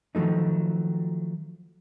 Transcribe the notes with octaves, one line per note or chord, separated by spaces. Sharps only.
D#3 F3 F#3 A3 D#4